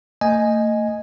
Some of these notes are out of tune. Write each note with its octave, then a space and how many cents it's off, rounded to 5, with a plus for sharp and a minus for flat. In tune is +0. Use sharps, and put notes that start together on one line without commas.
A3 +40 D#5 +0 G#5 +0